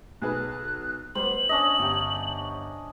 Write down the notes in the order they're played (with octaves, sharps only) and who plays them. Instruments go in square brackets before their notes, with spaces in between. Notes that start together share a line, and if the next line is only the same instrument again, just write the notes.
[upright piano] B1 G#4 B4 [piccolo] F#6
[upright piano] G3 B3 [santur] C5 [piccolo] F#7
[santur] C#4 D4 D#5
[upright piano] G1 G4